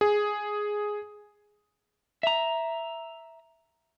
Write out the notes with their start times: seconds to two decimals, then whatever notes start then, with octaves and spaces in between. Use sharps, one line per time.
0.01 G#4
2.23 E5 A#5